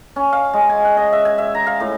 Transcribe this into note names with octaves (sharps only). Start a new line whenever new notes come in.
C#4
F5
G#3
G#5
F#5
D#5
E5
G#5
E5
A#5
F5
A2